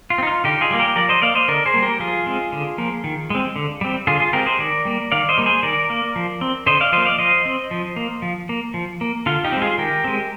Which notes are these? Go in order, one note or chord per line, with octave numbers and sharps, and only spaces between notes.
F4
C4
D#4
F4
D3 D#4 G4
F4 G#4
G3 A#3
G4 A#4
F3 A#4 D5
C5 D#5
A#3 D5 F5
C5 D#5
D3 A#4 D5
G#4 C5
G3 A#3
G4 A#4
F3 F4 G#4
G#3 C4
D3
F3 A#3
D#3
G#3 C4
D3
G3 C4
D3 F4 G#4
F4 G#4
G#3 C4 G4 A#4
G#4 C5
D#3 A#4 D5
G3 A#3
D#3 D5 F5
C5 D#5
G3 A#3
G#4 C5
D#3 A#4 D5
A#3
F3
C4
D3 C5 D#5
D5 F5
F3 A#3 C5 D#5
D5 F5
F3 C5 D#5
C4
F3
A#3
F3
A#3
F3
A#3
D3 F4
D#4 G4
G#3 C4
F4 G#4
D#3 G4 A#4
G#3 C4